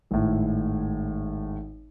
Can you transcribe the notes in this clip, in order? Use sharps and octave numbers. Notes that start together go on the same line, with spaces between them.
G#1 A2